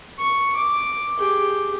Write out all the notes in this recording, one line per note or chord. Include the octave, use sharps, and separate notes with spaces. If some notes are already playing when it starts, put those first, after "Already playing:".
C#6
D6
G4 G#4